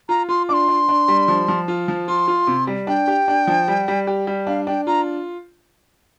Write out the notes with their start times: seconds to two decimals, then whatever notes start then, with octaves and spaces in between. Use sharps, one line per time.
0.09 F4 A#5
0.29 F4 C6
0.49 D4 C6 D6
0.68 D4
0.89 D4
1.08 G3
1.28 F3
1.48 F3
1.68 F4
1.88 F3
2.08 F4 C6
2.28 F4
2.47 C3
2.67 G3
2.87 D4 G5
3.08 G4
3.28 D4
3.47 F3
3.68 G3
3.88 G3
4.07 G4
4.27 G3
4.47 D4 F5
4.67 D4 G5
4.87 F4 A#5